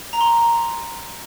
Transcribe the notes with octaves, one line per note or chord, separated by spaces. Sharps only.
A#5
C6